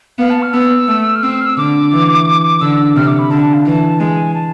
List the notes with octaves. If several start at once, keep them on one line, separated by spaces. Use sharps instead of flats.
B3 F5
A5
F6
B3 E6
A3
F6
C4 E6
E6
F6
E6
D3 D6
E3
D3 E6
C3 F6
D6
B5
D3 A5
A5
F5
E3 A5
G#3 G#5
A5